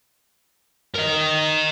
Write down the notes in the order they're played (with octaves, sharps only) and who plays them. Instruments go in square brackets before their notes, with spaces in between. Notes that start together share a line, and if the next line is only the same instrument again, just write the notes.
[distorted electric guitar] A#4 D#5